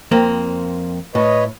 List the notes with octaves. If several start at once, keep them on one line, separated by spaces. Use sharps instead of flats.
F2 A#3 C4
A2 B4 C#5 D#5